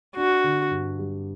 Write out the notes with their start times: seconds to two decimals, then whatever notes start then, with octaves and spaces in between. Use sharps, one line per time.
0.17 D4 F#4
0.44 D3
0.71 G2
0.99 G3